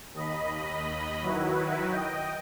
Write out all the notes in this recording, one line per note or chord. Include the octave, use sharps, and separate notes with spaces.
D#2 D#5 B5
D#3 F#3 E4 F#4 B4
D#5 G5